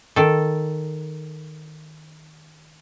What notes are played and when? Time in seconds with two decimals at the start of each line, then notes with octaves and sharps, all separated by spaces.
0.16 D#3 A4